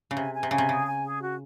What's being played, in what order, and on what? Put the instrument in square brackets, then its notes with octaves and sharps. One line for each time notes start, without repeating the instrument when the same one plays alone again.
[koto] C#3
[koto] C3 [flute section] G#5
[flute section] G#5
[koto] C3
[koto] C#3 [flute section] G#5
[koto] C3
[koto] C#3 [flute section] G#4
[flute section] G#5
G#4
F#4